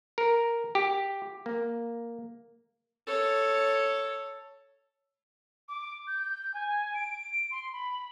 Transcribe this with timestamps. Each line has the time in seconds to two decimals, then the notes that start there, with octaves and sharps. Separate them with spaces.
0.18 A#4
0.75 G4
1.46 A#3
3.07 A4 C#5
5.69 D6
6.07 G6
6.54 G#5
6.94 D7
7.51 C6
7.73 B5